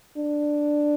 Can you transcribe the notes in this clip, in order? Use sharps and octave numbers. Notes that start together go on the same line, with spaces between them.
D4